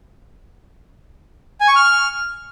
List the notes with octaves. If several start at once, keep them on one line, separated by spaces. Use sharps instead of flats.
G#5
C#6
F6